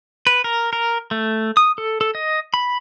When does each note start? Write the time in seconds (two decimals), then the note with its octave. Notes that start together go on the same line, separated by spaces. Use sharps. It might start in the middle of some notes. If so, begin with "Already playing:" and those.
0.27 B4
0.44 A#4
0.73 A#4
1.11 A3
1.57 D#6
1.78 A4
2.01 A4
2.15 D#5
2.54 B5